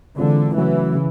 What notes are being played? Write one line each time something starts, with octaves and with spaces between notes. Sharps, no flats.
D3 E3 G#3 C4 F4
C#3 E3 F#3 A3 C#4 F#4
C#3